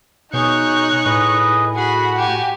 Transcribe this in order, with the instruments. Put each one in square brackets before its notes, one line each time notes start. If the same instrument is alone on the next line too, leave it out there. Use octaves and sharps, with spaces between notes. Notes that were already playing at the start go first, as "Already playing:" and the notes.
[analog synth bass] B2 [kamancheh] D#4 F#6 [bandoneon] G#4 G6 [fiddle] C#5 C#6
[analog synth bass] A2 [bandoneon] G#4 B4 D#5
[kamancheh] F#4 [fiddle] G#4 B5 [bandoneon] F#5
[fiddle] G4 G#5